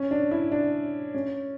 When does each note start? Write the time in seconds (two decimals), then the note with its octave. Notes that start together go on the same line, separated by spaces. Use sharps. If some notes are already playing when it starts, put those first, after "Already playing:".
Already playing: C#4
0.11 D4
0.31 E4
0.52 D4
1.14 C#4